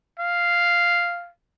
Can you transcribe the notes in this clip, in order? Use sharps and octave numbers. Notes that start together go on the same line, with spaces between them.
F5